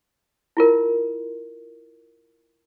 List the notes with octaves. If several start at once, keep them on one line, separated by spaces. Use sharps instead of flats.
E4 F4 A#4